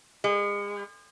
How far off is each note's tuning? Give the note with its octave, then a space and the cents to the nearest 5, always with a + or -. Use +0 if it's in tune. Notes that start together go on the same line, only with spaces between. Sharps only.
G#3 -35